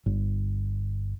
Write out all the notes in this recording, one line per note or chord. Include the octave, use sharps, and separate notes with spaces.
G1